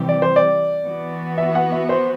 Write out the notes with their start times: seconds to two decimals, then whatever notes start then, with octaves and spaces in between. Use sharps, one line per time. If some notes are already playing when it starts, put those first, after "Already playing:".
Already playing: C3 E3 G3 C4 G4
0.09 D5
0.22 C5
0.36 D5
0.86 E3 B3 F#4
1.38 E5
1.55 F#5
1.72 E5
1.89 C5